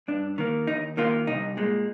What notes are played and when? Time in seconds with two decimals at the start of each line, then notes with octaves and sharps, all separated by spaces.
0.08 G2 D4
0.38 D#3 A#3
0.67 D#2 D#4
0.97 D#3 A#3 F4
1.27 C2 D#4
1.57 A#2 G#3